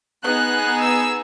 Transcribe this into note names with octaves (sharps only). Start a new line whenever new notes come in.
B3 D#4 G#4 F#6
E6